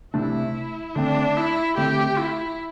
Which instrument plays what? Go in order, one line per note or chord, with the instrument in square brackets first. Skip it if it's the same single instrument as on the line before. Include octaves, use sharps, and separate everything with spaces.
[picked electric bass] C3 A3 D4 [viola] E4
[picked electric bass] D3 A3 C4 [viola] D4
[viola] E4
[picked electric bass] D3 A3 C4 [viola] G4
[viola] E4